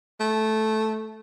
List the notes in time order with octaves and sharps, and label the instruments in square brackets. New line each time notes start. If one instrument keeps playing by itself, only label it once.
[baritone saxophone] A3